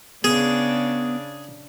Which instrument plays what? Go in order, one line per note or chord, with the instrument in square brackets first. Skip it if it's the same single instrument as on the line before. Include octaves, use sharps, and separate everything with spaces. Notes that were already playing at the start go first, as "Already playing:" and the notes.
[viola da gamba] C#3 D4 [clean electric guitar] B3 [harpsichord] G#4